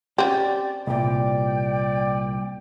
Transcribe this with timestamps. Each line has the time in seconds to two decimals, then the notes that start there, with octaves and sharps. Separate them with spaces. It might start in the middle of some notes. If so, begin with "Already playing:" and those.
0.18 C4 C#4 G4 D5
0.87 C2 A#2 D5 G5